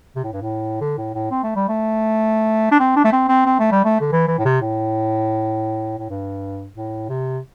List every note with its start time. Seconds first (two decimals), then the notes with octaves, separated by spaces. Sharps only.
0.16 C3
0.24 A2
0.33 G2
0.42 A2
0.81 D3
0.98 A2
1.14 A2
1.31 C4
1.43 A3
1.56 G3
1.69 A3
2.71 D4
2.80 C4
2.96 D4
3.05 A3
3.12 C4
3.29 C4
3.46 C4
3.59 A3
3.72 G3
3.84 A3
4.01 D3
4.12 E3
4.28 E3
4.38 A2
4.45 C3
4.61 A2
5.99 A2
6.10 G2
6.75 A2
7.09 C3